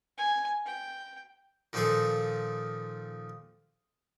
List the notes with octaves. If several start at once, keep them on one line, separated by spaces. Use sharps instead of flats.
G#5
G5
A#2 D#3 F3 D#4 G#4 A4